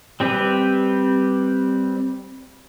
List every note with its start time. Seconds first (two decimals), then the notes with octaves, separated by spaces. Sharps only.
0.20 G3 C4 G4 B4